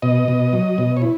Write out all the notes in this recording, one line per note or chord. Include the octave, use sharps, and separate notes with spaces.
B2 D#5
B2
F#3
B2
C#5
E4